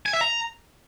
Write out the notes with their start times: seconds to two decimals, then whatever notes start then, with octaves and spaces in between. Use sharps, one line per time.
0.06 G#5
0.13 E5
0.21 A#5